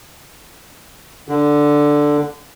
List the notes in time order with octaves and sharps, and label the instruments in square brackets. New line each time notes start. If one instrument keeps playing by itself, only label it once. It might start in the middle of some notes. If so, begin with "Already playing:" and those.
[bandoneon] D3